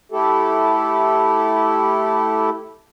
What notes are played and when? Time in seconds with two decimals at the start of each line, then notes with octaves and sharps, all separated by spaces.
0.12 A3 E4 G4 A4